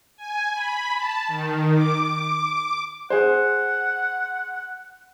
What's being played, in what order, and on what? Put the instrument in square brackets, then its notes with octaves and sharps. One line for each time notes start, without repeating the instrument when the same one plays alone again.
[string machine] G#5
B5
A5
D#3
D6
D6
[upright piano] G#4 C5 [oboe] F#5